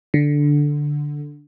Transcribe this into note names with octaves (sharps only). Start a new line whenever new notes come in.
D3